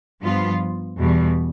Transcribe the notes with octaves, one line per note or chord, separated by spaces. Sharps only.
G2 F3 B3 F4
E2 B2 G3